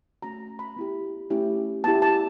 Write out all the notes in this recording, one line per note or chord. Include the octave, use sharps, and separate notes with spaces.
A3 C#4 F#4 A#5
B5
B3 E4 G4
A3 C#4 E4 G4
B3 E4 G4 A5
A5